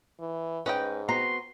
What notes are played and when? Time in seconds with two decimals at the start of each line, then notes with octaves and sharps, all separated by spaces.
0.20 E3
0.66 G#2 C#4 B4 D#5 G5
1.09 B3 C4 F#4 A#5 C6